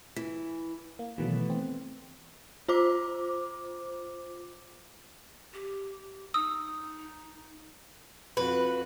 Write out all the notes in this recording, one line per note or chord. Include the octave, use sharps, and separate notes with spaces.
E3
A#3
B2 D#3 E3 F#3 A3 B3
C4
F4 C5 D6
G4
D#4 D#6 E6
F2 F#4 B4